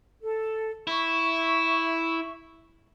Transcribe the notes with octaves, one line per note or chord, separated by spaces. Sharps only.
A4
E4 E5 C#6